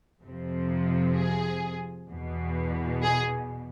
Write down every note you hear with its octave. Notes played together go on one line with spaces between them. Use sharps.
F2 C3 F3
G#4
E2 B2
G#4